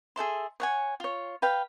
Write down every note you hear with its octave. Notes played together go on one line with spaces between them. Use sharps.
G#4 A4 E5 C6
C#5 F#5 G#5
F4 C#5
B4 F5 G5